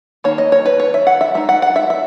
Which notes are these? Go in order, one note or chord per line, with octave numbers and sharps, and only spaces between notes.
D#3 A#3 C#5
D#5
C#5
B4
C#5
E5
F#5
E5
G#3 D#4 E5
F#5
F#5
E5
E5